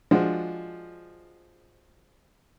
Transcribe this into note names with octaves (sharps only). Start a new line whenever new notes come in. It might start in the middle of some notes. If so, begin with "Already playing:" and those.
F3 G#3 D4 F#4